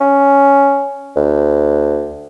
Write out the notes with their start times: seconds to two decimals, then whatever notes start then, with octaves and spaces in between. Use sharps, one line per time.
0.01 C#4
1.16 D2